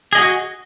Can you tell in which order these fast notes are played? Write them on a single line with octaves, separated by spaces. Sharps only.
G#4 D#5 F#4